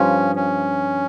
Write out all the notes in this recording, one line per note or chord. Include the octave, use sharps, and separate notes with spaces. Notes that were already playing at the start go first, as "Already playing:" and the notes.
Already playing: G2 F3 C#4
C#4